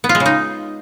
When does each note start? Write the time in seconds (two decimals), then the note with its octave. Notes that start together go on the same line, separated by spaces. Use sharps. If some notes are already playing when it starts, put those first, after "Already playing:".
0.04 B3
0.09 F4
0.15 G#3
0.20 C#3
0.26 D#4